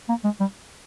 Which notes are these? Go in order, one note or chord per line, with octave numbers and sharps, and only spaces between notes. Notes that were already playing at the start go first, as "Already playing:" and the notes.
A#3
G#3
G3